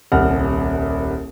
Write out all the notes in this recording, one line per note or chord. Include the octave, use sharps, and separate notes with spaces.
D#1 C2 F#5 F6